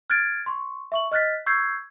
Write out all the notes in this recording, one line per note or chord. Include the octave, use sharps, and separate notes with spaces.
F6 F#6 G#6 A6 D7
C6 C#6
E5 C#6 F#7
D#5 F6 F#6 A6 B6
C#6 E6 G6 G#6 C7